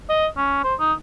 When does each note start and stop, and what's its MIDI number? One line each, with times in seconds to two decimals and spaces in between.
0.10 0.27 75
0.37 0.60 61
0.64 0.74 72
0.80 0.93 63